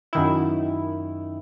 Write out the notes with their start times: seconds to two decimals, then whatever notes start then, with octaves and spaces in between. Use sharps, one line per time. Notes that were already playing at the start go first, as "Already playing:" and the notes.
0.13 F#2 D#3 E4